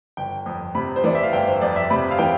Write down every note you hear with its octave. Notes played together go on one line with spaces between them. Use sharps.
G1 G5
F2
C3 B5
C5
E3 D5
E5
F5
G1 G5
C5
F2 D5
E5
C3 B5
F5
E3 G5